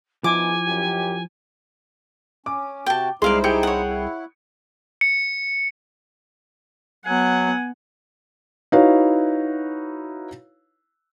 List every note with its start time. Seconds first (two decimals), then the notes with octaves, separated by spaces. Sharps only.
0.24 F3 B3 D#4 E4 G#4 G#5 D6
0.67 F#2 G4
2.46 C#4 D6
2.86 C3 F#4 G5 A5
3.22 C2 G#3 D#4 E4 C5 D5 F5 C6
3.44 G4 G#4 G5 C#7
3.63 C#5 F#5
3.88 E4
5.01 C#7
7.06 F#3 B3 F#5 G#5
8.72 D#4 E4 F#4 B4 C#5 F5